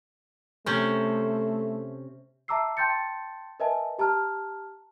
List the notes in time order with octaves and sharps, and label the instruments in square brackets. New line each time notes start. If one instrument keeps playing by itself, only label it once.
[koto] C3 C#4 C5 [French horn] A3
[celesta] E5 A5 A#5 D6 E6 C7
G5 A5 C6 G6 A6 C#7
A#4 B4 D#5 E5 G#5 A5
G4 A5 A#5 F6